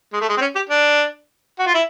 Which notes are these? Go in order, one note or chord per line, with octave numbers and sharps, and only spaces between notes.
G#3
A3
G#3
C4
C#4
G4
D4
F#4
F4
E4